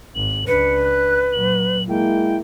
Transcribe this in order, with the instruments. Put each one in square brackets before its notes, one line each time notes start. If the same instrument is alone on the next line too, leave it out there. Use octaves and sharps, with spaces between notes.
[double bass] G#1 [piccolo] F#7
[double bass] C#2 D4 [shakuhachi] B4 [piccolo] C#7
[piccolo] F#6
[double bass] A#2 F#3 [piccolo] F#7
[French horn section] G#3 E4 [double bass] A#3 [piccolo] G5